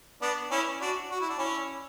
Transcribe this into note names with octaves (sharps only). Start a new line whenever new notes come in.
B3 D4
C#4 E4
D4 F#4
F#4
E4
D4
C#4 E4